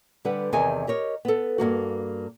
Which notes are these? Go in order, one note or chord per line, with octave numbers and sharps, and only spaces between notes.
D3 G3 A4 B4 F#5
E2 C3 D#3 G#4 A#4 G#5
G4 A#4 C#5 D#5
B3 A4
G2 D#3 A#3 F#4